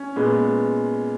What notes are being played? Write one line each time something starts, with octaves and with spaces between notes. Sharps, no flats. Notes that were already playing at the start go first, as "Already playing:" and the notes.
Already playing: C#4
A#2 G#3 B3